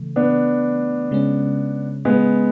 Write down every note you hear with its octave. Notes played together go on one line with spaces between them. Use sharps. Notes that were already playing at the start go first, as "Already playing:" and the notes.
Already playing: C#3 E3 A3
B3 D4
C#3 G#3 C#4
G#3 B3